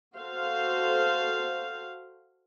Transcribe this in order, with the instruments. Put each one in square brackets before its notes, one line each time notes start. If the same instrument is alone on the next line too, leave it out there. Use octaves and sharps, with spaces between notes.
[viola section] F#4 A4 C5 F5